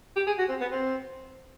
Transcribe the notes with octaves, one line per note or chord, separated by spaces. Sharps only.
G4
G#4
F#4
C4
B3
C4